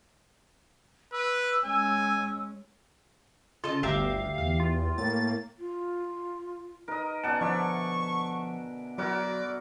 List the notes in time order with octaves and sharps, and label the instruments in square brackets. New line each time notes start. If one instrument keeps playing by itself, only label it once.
[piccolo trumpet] B4 [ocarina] E6
[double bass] G#3 C#4 [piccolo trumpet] G#5
[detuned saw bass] C#3 [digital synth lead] F4 [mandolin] A4 D#5
[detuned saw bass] G1 [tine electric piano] D2 [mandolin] G4 E5 A#5 [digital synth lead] F5
[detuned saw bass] E2 [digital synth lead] F5
[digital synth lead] F4
[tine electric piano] A2 [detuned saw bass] A#3 [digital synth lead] A6
[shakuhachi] F4
[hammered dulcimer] D#4 B4 [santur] A#4 D#5
[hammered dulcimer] B2 D#5 G#5 [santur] C#4 D5 F#5 [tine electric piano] A5
[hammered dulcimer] D3 [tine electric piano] F3 [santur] D4 E5 [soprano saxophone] C#6
[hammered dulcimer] D3 [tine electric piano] F#3 [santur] E4 F#4 A#4 [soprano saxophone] D5